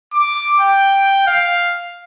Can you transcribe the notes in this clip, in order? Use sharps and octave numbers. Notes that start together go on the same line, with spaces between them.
D6
G5
F5